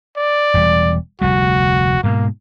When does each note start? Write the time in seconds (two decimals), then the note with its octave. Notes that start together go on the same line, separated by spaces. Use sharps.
0.17 D5
0.54 E1 E2 G3
1.21 F1 D2 G3 F#4
2.04 G#2 B2 G#3 A#3